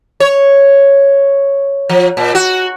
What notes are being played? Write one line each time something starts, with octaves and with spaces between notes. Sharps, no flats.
C#5
F3
A#2
F#4